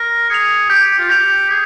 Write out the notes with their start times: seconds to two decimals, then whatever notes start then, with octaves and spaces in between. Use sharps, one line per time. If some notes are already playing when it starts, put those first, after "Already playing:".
Already playing: A#4
0.30 G#4 C#7 F7
0.70 G4 G6
0.99 F4
1.10 G4 C#7 F7
1.49 G#4 G6